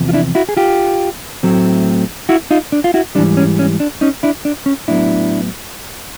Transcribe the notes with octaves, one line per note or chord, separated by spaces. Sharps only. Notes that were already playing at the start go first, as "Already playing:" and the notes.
Already playing: E2 C3 F3
F4
D4 E4
E4 F#4
G#4
F4 G4
A2 F#3 A3 C4
E4 F#4
D#4 F4
D4
F4
E4 F#4
G#2 E3 G3 D4
C#4
C#4
D4
C#4 D#4
D4 E4
D4
C#4
A2 F#3 B3 D4 E4